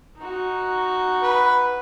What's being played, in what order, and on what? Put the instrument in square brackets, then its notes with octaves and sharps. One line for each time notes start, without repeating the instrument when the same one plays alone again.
[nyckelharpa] D#4 F#4
[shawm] B4